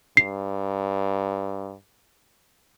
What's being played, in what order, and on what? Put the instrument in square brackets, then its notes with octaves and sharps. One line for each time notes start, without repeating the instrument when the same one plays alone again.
[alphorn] G2 [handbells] C7